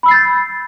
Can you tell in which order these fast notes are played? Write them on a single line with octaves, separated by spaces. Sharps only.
B5 E6 C7 A6 G6